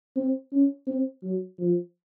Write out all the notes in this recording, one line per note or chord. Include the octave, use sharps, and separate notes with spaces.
C4
C#4
C4
F#3
F3